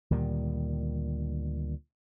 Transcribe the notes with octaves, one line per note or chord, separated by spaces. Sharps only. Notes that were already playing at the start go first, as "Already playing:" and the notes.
D2 A#2 D#3 G3